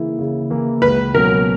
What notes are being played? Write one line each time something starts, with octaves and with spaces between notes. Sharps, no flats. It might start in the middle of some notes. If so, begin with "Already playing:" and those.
Already playing: C#3 E3 A#3 E4
C#3
E3 A#3 E4
C#2 B4
B2 F#3 C#4 A#4